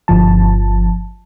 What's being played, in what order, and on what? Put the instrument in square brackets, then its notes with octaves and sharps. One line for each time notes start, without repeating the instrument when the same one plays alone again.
[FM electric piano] G1 F3 A5